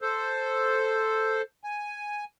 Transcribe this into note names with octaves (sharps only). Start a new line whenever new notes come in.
A4 C5
G#5